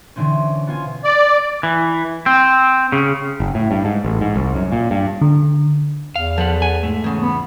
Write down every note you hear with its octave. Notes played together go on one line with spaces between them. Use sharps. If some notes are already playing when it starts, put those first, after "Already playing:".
B2 D3 E3 C4 C#4
B3 F4 G#5
D5
E3
C4
C#3
F#1
A2
G2
G#2
A1
G#2
C2
F#2
A#2
G2
D3
E2 F5
F3 A4 B4 F#5
G#5
G#2 A3
E2 C#3
B3